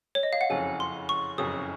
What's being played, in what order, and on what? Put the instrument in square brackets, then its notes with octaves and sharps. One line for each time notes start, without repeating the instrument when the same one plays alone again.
[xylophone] C#5
D#5
F5
F#5
[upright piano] F#1 F2 C#3 [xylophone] G#5
[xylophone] C6
C#6
[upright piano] F#1 F2 C#3 [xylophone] D#6